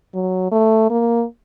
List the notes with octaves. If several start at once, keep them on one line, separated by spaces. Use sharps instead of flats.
F#3
A3
A#3